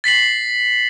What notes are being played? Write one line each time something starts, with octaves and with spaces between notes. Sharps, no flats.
A6 B6 C7 F#7